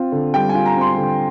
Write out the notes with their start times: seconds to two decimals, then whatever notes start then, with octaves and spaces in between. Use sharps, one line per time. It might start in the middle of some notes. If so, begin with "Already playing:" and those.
Already playing: C4 F4
0.12 D3
0.34 G3 G5
0.49 G#5
0.55 F4
0.66 A#5
0.77 C4 C6
0.97 D3